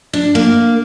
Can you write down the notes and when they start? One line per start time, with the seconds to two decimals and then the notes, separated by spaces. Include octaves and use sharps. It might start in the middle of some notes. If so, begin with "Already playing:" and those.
0.13 D4
0.35 A#3